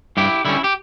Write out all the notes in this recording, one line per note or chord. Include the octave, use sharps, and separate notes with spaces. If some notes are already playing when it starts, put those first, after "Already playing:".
G2 E4 G4
D3 G3 C#4 E4
G4